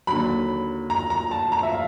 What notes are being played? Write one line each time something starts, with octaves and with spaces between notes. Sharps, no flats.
D#2 D3 F#3 B5
A#5
A#5
A5
A#5
E5
F5